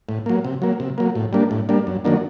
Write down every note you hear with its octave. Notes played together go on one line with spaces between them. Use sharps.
A2
F#3 A#3
C3
F#3 A#3
C3
F#3 A#3
A2
G3 A#3 D4
A2
G3 A#3 D4
F#2
D#3 F#3 A#3 D4